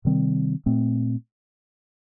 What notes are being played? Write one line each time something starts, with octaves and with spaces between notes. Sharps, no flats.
C3 D#3 G3 C4
A#2 A3 C4